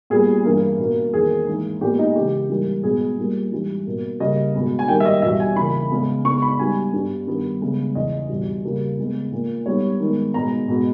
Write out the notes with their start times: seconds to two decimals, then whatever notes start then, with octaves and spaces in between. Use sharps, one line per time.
0.10 A#2 G3 B3 G#4
0.44 G2 E3 A#3
0.79 B2 A#3
1.13 E2 D#3 A#3 G#4
1.47 G#2 E3 A#3
1.81 A#2 G#3 B3 G4
1.99 D#4
2.16 C#3 E3 G#3 G4
2.50 G#2 E3 G3 A#3
2.83 B2 G#3 B3 G#4
3.18 A#2 G3 A#3
3.52 G#2 E3 G3
3.86 B2 A#3
4.20 C#3 G3 A#3 D#5
4.55 B2 G#3 B3
4.79 G#5
4.88 G#2 D#3 G3 A#3 G5
5.00 E5
5.05 D#5
5.22 E2 B2 G3 E5
5.40 G#5
5.56 C#3 E3 A#3 B5
5.91 C#3 G#3 B3
6.25 C#3 G#3 B3 C#6
6.42 B5
6.59 G#2 G3 B3 G#5
6.93 G2 G3 B3
7.27 G2 D#3 G3 B3
7.61 C#3 G#3 B3
7.95 E2 C#3 E3 D#5
8.29 E2 B2 G3
8.64 C#3 G3 A#3
8.98 C#3 G#3 B3
9.32 A#2 A#3
9.66 G#2 G3 B3 C#5
10.00 G#2 D#3 G#3 B3
10.34 B2 G#3 B3 A#5
10.68 B2 G#3 B3